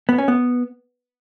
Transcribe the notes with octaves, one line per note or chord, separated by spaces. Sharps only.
B3
C#4
B3